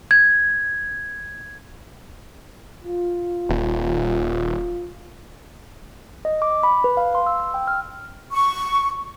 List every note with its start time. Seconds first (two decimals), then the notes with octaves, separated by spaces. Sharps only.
0.11 G#6
2.85 F4
3.49 D#1
6.25 D#5
6.42 D6
6.63 B5
6.84 B4
6.97 F5
7.15 C6
7.26 E6
7.40 E6
7.54 G5
7.67 F6
8.32 C#6